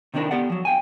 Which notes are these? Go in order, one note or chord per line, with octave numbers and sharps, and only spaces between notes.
C3 D#3 C4 D4 E4 A#4
B3 G4 D5 F#5
F3 F#3
F5 G5 G#5